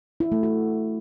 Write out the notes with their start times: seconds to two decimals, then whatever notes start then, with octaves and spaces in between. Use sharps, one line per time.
0.20 E4
0.32 A3
0.43 F#4